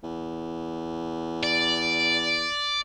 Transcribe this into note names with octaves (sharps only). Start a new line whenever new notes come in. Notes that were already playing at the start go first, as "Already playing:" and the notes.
E2
D5